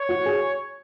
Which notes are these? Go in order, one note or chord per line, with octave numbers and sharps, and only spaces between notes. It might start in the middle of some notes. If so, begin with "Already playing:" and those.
Already playing: C#5
F#4
G#4